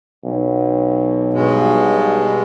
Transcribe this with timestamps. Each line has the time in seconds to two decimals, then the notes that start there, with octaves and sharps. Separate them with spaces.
0.24 B1
1.33 G2 B2 G#3